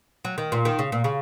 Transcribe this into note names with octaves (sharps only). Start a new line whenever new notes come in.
F#3
D#3
A#2
D#3
C#3
A#2
C#3